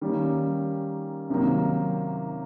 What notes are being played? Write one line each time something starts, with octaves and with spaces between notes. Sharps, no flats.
D#3 G3 A#3 C#4
C3 D#3 F#3 A#3